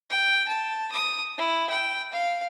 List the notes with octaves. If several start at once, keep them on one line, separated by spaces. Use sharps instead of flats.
G5
A5
D#6
E4
G5
F5